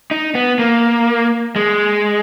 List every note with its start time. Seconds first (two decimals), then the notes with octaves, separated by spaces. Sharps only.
0.11 D#4
0.35 B3
0.59 A#3
1.56 G#3